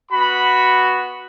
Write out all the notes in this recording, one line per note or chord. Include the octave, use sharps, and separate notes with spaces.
B3 F#4 B5